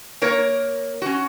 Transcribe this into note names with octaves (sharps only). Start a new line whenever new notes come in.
A#3 A#4 C#5
C#4 F#4